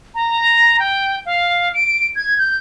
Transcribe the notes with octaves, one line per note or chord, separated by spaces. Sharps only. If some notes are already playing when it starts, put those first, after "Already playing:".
A#5
G5
F5
D7
G#6
G6